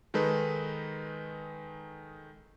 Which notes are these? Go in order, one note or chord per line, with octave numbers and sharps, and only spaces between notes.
D#3 G#3 D#4 A4 B4